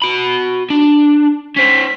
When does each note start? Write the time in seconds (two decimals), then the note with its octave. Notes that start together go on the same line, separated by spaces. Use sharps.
0.02 F#4 B5
0.70 D4
1.56 C#4 C5 B6